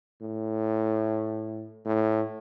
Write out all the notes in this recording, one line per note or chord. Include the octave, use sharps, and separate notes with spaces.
A2
A2